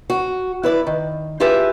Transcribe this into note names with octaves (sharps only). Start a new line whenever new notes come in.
F#4
E4 B4 D5
D#3
E4 F4 G4 G#4 B4 E5